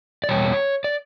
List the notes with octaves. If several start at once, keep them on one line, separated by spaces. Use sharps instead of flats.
D5
E2 B2 G3 C#5
D5